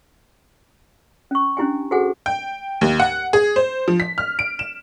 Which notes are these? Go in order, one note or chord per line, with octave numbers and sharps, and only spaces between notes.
C#4 C#6
C#4 D4 E4 G4 G5 G#5
F#4 G#4 A4 C5 F#5 G#5
G5
D#2
F#5
G#4
C5
F3
B6
F6
D7
E7